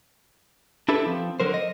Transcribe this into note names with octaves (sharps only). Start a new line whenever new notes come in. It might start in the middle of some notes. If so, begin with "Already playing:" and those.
D4 E4 G4 A4 B4
F3 C4
D3 F#3 A#4 C5
D#5